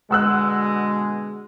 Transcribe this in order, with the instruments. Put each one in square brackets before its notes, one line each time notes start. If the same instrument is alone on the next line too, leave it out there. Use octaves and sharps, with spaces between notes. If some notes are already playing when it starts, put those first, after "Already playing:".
[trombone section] B2 D3 G#3 [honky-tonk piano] F#5 E6 F#6